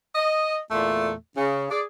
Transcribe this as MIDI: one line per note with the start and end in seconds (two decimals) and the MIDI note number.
0.15 0.59 75
0.71 1.13 40
0.71 1.13 46
0.71 1.13 57
1.37 1.68 49
1.71 1.83 68
1.71 1.83 74